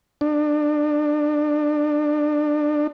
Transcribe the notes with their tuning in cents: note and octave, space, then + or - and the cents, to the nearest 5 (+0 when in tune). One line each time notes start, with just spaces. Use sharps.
D4 +25